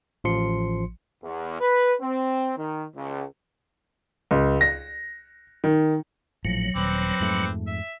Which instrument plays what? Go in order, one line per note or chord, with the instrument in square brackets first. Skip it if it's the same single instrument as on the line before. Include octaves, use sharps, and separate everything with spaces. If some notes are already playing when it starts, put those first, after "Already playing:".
[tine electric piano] A1 F3 C6 C#7
[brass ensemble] E2
B4
C4
D#3
C#2
[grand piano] C#2
A#6
D#3
[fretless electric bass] A#1 A2 F3 [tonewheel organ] F#3
[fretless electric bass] D#1 [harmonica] C4 B4 D6
[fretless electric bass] F2 G#2 A3
[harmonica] E5